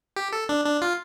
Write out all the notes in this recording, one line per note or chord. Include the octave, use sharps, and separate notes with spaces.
G4
A4
D4
D4
F4